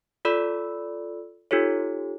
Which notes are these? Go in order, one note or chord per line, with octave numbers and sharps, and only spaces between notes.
F4 A4 D5 B5 E6
D#4 F4 G4 A4 C#5